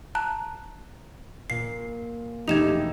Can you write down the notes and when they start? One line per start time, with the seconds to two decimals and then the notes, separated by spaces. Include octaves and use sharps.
0.15 A5 A#5 F#6
1.50 A#2 C7
2.48 E1 A3 D#4 G4 G#6 E7 F7